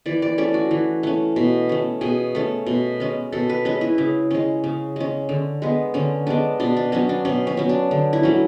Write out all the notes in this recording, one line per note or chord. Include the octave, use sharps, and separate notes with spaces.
E3 D5
D5
A3 C#4 D5
F#4
E3
A3 C#4
B2
A3 C#4
B2 G#4
A3 C#4
B2
G#3 C#4
B2 A4
B4
G#3 C#4 B4
E4
C#3
G#3 C#4
C#3
G#3 C#4
D3
G#3 B3
D3 C#4
G#3 B3 D4
B2 D4
D4
F#3 B3 C#4
D4
B2 C#4
C#4
F#3 B3
D4
D3
E4
F#3 A3 C#4